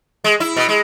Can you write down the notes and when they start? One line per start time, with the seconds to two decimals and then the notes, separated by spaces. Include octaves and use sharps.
0.24 G#3
0.40 E4
0.57 B2
0.69 G#3